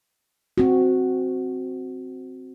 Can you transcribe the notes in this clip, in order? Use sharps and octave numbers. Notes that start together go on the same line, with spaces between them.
C4 F#4